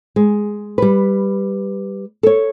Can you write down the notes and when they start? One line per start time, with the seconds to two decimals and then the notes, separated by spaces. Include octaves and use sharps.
0.16 G#3
0.78 G3 B4
2.23 A4 C#5